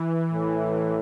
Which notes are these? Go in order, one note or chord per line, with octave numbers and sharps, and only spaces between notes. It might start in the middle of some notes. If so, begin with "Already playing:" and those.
Already playing: E3
A2